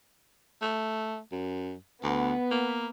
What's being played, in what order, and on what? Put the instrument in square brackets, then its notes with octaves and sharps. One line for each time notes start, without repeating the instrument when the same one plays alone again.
[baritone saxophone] A3
F#2
[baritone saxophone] D2 [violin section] B3
[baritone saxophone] A#3